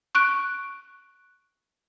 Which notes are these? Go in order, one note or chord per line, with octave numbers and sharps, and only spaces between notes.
C#6 F#6 D7